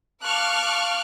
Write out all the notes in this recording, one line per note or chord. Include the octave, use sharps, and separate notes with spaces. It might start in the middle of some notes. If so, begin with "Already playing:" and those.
F5 A5 C#6 D6 F6 F#6